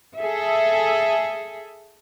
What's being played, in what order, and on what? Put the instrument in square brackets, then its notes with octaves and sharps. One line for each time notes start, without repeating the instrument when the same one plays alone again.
[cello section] G#4 A4 E5